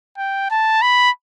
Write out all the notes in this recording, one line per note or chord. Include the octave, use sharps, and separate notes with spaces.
G5
A5
B5